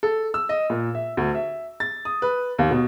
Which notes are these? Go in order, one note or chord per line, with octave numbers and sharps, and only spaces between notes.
A4
E6
D#5
A#2
E5
D2
E5
A6
D#6
B4
D#2
B2